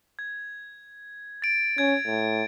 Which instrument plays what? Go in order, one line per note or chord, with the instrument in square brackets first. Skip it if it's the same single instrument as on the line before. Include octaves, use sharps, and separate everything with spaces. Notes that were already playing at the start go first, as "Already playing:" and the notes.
[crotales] G#6
A6 D7
[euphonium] C#4 [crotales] G#6
[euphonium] A2